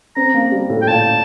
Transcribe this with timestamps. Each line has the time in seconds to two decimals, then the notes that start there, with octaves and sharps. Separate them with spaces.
0.16 C4 A#5
0.34 A#3
0.52 G3
0.70 A2
0.82 G5
0.88 A#2 A5